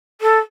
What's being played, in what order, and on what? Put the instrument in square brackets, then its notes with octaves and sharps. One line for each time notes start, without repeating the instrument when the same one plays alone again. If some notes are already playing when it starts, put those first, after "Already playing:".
[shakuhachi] A4